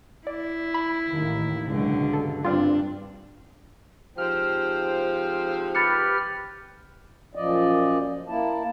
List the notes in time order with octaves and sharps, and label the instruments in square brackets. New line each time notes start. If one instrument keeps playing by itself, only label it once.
[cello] E4 [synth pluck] D5
[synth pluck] B5
[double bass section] A1 D#2
[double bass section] C#2 F#2 [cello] B2 D3
[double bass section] G2 [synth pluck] A4
[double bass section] G2 [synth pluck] G3 C4 F4 [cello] D4
[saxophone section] G#2 C3 F3 [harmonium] C5 G5 [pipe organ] F6
[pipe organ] G4 B4 F6 [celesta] B5 A6 C#7
[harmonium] F#2 A#2 F3 D5 D#5
A#3 E4 A5